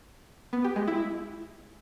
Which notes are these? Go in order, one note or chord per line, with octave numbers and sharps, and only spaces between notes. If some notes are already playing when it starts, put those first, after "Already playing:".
B3
G4
G#3
E4